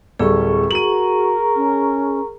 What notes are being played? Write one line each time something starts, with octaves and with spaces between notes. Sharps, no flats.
D1 G3 G#4 A4 C#6
F#4 A#4 D#7 F#7
C#4